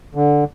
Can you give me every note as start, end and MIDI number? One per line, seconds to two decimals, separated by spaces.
0.15 0.44 50